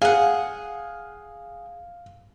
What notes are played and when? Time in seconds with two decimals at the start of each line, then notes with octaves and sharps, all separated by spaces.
0.02 G#4 F5 F#5